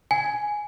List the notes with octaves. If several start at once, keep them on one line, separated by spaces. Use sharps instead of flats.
G#5